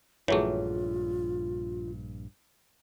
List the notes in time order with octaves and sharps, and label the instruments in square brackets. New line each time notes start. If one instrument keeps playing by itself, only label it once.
[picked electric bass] A#1 G2 [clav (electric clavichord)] E3 F#3 A3 [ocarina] F4 [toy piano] G#4 C#5